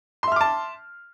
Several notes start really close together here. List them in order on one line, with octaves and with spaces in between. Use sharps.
C6 E5 F6 D6 A5